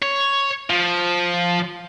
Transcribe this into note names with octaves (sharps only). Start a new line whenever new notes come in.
C#5
F3